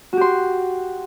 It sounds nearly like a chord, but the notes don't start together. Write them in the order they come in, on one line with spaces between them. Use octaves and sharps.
F#4 G4 C6